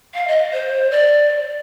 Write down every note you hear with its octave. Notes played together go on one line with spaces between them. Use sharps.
F5
D#5
C5
D5